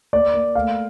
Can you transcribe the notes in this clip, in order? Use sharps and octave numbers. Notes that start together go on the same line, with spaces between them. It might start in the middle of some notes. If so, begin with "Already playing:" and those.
A#3 D5
A#3
A3 F5